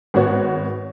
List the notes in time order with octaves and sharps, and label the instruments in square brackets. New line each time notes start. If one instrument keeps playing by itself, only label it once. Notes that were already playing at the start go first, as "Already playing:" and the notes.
[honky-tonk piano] G#1 B3 F#4 C#5